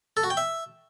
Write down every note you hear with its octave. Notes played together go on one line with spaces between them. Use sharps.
A4
F#4
G5
E5